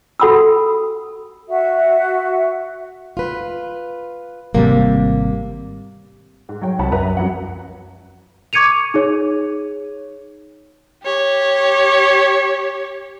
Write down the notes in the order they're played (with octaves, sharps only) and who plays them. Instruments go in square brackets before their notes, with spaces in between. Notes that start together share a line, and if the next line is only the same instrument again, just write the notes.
[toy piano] F#4 A4 F#5 B5 D#6 E6
[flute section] F#4 E5
[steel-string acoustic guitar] F4 B4
[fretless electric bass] G#1 C3 G3 [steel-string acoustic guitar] A#3
[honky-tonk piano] G#2
F#3 C#5 G5
[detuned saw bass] C2 [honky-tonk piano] F#5 A5 B5
[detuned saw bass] F#2 [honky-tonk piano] B4 E5 A#5
[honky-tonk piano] F2 F#3 F#5
[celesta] C#6 D6 G#6 C#7 D#7 F7
D#4 G#4 C#5
[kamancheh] G4 C#5